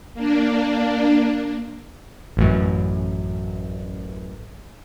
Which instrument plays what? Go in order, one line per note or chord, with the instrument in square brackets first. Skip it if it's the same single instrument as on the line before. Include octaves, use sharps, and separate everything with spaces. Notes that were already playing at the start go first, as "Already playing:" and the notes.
[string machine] A#3 D4
[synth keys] A1 F#2